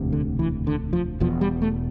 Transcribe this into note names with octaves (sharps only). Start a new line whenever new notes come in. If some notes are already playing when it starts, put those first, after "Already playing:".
Already playing: E1 D2 C3
D3
E3
D3
F3
E1 E2 B2 F3
G3
A3